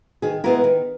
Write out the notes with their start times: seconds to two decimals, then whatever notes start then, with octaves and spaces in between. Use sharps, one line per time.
0.22 D#3 G#4
0.44 G#3 B3 E4 A#4
0.64 D#3